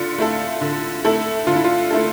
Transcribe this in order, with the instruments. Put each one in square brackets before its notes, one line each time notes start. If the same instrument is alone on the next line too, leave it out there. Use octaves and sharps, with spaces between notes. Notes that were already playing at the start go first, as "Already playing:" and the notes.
Already playing: [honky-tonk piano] D3 [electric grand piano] F4
[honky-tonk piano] A3 E4 A4
D3
A3 E4 A4
[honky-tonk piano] D3 [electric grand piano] F4
[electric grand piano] E4
F4
[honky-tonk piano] A3 E4 A4